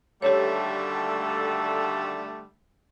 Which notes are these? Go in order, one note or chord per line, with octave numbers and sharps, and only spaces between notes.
D#2 D3 G3 A3 F#4 G4 A4 C#5